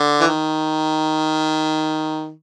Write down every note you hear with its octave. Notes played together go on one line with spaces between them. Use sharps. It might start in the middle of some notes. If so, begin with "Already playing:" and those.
Already playing: D3
E3
D#3